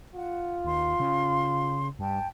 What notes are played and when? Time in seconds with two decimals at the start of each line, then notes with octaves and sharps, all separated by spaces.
0.15 F4 F#5
0.65 D#2 C6
1.00 C#3
1.99 G2 G5 A5